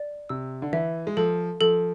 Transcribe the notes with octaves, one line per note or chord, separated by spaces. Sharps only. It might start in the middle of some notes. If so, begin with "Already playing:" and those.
Already playing: D5
C3 E6
D3
E3 E5
G#3
F3 A4
F3 A4